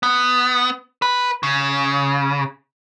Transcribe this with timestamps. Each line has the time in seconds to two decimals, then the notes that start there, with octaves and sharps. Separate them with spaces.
0.03 B3
1.02 B4
1.43 C#3